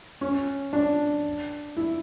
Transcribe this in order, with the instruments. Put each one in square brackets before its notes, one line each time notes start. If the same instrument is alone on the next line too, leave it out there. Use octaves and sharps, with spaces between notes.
[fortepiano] C#4
D4
E4